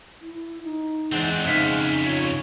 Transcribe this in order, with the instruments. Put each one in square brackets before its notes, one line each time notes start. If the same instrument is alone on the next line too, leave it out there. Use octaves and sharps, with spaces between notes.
[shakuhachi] E4
D#4
[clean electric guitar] E2 [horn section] G#3 C5 F#5 [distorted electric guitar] C4 D4
[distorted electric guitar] F2 C#3 [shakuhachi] D#4 [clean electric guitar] G#4 E5 F5
[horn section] F4 C#5